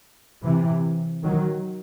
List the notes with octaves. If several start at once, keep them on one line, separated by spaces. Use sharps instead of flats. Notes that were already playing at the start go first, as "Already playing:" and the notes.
C3 E3
D#3 F#3